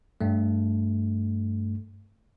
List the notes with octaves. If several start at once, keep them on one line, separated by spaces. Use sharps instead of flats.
G2 A3